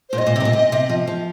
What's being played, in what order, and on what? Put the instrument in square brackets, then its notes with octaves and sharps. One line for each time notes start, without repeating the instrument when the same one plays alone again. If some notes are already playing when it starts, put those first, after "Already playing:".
[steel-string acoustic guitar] A#2 [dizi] C5
[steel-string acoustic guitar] G2 [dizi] D#5
[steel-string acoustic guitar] A#2
C3
G2
A#2
C3
C3
F3
F3